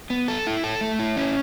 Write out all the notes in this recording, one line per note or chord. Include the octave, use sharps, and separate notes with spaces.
B3
A4
E4
A4
A3
E4
C#4